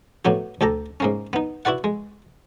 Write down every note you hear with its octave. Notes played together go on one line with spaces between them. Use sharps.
A2 F#3 B3 G4
D2 G4 A4 A#5
G#2 A#3 C#4
B3 D#4
E4 F#4 B4 D5 F#5
G#3